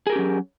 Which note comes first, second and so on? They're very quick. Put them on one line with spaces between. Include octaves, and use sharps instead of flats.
G#4 A#4 G4 C#4 F#3